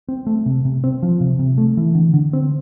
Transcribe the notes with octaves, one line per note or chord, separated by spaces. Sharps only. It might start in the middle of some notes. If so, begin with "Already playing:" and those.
C4
A3
C3
C3
C4
F3
C3
C3
A3
E3
D3
D3
C4